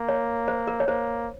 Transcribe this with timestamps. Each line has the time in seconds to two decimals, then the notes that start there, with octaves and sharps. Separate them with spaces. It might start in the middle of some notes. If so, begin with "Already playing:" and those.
Already playing: A#3
0.09 C#5
0.48 C5
0.67 A#4
0.80 C#5
0.87 A#3 C5